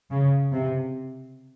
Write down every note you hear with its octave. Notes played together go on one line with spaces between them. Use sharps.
C#3
C3